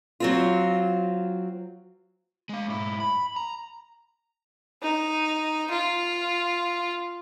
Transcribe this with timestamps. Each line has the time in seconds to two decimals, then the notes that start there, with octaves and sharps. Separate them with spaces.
0.20 F#3 C4 F4
2.49 G#3 F5
2.68 G#2 E4
3.00 B5
3.36 A#5
4.83 D#4
5.71 F4